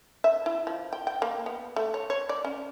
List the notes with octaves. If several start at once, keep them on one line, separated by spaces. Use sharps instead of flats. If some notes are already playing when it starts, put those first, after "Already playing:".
E5
E4
F3
G5
G5
A#3
B3
A3
C#5
C#5
D5
C#4